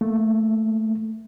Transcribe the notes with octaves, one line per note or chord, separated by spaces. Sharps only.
A3 A#3